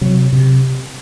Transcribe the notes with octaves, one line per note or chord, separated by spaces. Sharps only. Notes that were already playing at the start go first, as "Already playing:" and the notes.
C3 F#3
C3